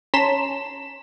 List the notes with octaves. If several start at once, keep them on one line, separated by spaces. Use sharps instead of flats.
C#4 A5 A#5 C6 B6 E7